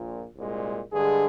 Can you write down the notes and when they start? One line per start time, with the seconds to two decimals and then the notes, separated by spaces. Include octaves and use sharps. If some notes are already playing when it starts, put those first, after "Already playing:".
Already playing: A#1 A#2
0.36 C2 A#2 G#3
0.92 G2 D3 G#3 G#4